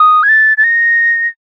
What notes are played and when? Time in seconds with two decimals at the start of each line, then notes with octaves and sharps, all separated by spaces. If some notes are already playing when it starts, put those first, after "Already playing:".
Already playing: D#6
0.23 G#6
0.29 A6
0.58 A6
0.64 A#6